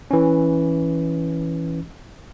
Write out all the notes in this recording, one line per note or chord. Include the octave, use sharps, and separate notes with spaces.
E3 C#4